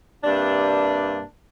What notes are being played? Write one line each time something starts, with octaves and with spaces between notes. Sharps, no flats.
G2 C3 A#3 D4